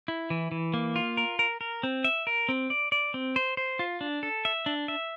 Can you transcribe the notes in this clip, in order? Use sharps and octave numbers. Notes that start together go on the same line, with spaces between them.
E4
E3
E3
A#3
F4
A#4
A#4
A#4
C4
E5
A#4
C4
D5
D5
C4
C5
C5
F4
D4
A4
E5
D4
E5